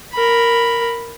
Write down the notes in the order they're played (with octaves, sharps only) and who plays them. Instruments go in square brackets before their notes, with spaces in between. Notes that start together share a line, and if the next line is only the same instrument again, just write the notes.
[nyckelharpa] A#4 B5